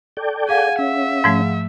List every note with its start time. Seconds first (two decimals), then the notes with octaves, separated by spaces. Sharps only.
0.17 A4 D5 G5
0.49 G#4 F5 F#5 G#5
0.79 C#4 E5
1.24 G#2 F3 A3